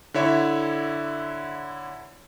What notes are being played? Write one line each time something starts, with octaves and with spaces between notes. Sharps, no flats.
D3 E4 C#5 E5